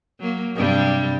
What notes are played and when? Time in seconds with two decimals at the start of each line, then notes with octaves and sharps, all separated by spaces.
0.20 F#3 A#3
0.55 G2 C3 G3